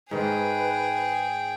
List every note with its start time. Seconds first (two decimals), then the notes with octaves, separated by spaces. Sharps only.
0.11 G#2 D#3 G#4 B4 G5